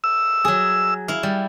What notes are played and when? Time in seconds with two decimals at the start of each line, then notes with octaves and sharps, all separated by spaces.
0.04 E6
0.45 F#3 G#4
1.08 E4 F5
1.23 G3